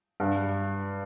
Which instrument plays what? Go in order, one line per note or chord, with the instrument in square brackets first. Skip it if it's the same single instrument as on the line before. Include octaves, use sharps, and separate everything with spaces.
[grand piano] G2